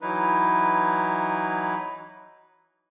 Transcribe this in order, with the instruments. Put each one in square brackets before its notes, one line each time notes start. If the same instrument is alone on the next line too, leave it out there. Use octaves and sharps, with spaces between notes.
[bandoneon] E3 F#3 D#4 E4 B4